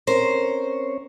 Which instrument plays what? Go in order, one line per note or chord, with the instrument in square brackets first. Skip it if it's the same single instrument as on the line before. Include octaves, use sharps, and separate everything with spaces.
[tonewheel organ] C4 C#4 C#5 [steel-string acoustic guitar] A#4 C5